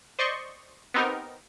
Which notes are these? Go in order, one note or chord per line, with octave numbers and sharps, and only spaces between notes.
C5 D5 D#5 C6 C#6
B3 C4 D#4 G4 A#4